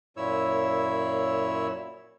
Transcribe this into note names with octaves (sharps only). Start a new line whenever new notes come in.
F#2 A#2 E4 C#5 E6